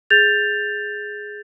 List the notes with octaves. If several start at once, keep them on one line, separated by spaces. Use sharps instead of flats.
G#4 G6 A6 F7